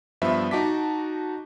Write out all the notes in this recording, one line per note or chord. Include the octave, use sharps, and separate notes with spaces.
G2 F3 B3 E5 B5
D#4 F#4 A5 D6 B6